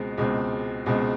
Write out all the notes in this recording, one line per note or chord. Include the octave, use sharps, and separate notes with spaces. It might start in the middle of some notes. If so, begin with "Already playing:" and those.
Already playing: C#2 B2 G#3 C4
C#2 B2 G#3 C4
C#2 B2 G#3 C4